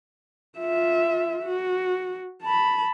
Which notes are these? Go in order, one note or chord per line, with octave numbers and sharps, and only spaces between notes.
F4 E5
F#4
A5 B5